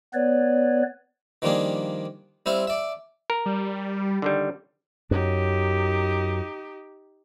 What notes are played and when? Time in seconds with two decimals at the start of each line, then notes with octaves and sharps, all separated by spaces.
0.14 B3 B4 C#5 D5
1.42 D#3 F3 G3 A#3 D4 G#4
2.46 G3 C4 E4 C5 F5
2.67 D5 E5
3.30 A#4
3.46 G3
4.22 D3 D#3 G3
5.11 F#2 D#4 G4